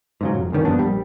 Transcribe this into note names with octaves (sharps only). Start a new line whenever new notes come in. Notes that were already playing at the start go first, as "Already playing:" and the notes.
G#2 C#3 F#3
F1
D2 G2 D#3 C#4
A#1 G2 B3 D4
A#1 G3